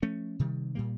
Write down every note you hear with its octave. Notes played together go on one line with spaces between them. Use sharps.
F3 A3 C#4
C3 D#3 G3
A#2 G3 A#3